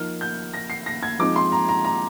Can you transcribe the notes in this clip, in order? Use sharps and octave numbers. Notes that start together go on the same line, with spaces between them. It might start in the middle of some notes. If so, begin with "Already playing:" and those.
Already playing: F3 A#3 D#4 F6
G6
A#6
C7
A#6
G#6
F3 G#3 C4 D#4 D6
C6
A#5
A#5
A#5